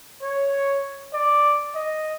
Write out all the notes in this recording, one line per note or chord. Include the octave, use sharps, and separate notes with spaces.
C#5
D5
D#5